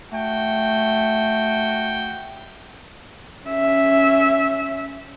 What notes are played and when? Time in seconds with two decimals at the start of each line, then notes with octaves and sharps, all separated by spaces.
0.13 A3 F#4 G5
3.46 C#4 E5